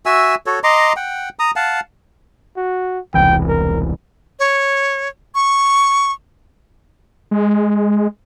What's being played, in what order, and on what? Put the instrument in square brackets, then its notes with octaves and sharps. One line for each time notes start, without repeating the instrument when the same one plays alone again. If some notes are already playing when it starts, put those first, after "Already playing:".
[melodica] F#4 E5 G#5 E6
F#4 A4 C#5
D#5 A#5 C6 D6
F#5 G5
A#5 D#6
F5 F#5 A5
[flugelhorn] F#4
[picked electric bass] E1 C2 E3 [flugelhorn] G5
[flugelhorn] A#4
[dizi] C#5
C#6
[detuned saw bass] G#3